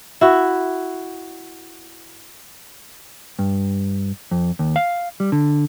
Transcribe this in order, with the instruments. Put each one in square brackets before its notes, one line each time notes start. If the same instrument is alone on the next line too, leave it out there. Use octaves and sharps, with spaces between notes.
[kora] E4 F#4
[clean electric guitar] G2
F2
D#2
F5
G3
D3